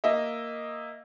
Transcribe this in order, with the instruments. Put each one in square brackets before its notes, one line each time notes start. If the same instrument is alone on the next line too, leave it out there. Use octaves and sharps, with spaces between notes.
[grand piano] A#3 D#5 E5